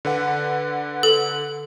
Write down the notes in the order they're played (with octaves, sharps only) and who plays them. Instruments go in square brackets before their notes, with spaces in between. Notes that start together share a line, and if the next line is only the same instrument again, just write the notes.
[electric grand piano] D3 B4 F#5
[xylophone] A4